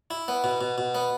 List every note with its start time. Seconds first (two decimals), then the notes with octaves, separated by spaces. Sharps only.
0.11 E4
0.28 B3
0.44 B2
0.61 B2
0.78 B2
0.95 B3